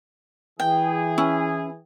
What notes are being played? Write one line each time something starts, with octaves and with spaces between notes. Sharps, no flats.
E3 G#4 G5
C#4 E4